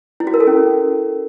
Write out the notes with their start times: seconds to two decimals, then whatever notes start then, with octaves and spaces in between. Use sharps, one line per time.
0.20 E4
0.27 F#4
0.34 A#4
0.40 A4
0.47 C#4